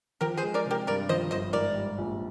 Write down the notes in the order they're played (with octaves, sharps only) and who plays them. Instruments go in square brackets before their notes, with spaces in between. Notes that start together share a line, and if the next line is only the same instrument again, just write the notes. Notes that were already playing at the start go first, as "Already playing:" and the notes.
[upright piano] F3 [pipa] G4 A#4
[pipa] G#4 C5
[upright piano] G#3
[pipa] A#4 D5
[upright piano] C3
[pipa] G4 A#4
[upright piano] G2 [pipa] A#4 D5
[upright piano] F3 [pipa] C5 D#5
[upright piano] G1 [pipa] C5 D#5
[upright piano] G#2 [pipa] A#4 D5
[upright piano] G3
A#1